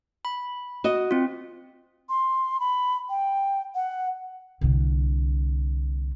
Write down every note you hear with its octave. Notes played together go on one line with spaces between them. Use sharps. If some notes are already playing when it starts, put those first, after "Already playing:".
B5
F#4 D#5
C4 F4
C6
B5
G5
F#5
C2 D3